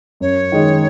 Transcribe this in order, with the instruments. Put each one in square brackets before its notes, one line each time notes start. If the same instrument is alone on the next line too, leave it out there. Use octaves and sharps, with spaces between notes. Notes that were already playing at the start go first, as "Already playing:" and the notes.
[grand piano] F#2 [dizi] C#5
[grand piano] D#3 G#3 D#4